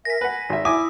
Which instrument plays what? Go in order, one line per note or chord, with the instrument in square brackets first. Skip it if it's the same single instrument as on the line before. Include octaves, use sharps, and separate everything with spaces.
[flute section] A#4 E5 G#5 [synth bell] A#6 B6
[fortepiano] B4 F#5 [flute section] G#5
[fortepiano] G#1 E5
[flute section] E4 [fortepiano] E5 G#5 [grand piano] D6 [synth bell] D#6